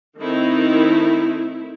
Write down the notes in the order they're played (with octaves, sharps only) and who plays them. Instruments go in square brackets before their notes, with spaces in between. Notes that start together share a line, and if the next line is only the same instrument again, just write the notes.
[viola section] D#3 A3 C4 D#4 E4